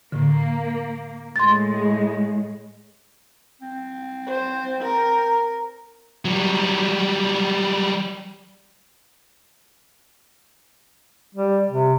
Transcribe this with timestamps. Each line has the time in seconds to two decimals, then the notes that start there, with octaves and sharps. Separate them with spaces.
0.12 A2 D3 A#3
1.36 A2 G#3 C6 A6
3.61 C4
4.27 C5
4.81 A#4
6.25 F#3 G3
11.35 G3
11.69 C3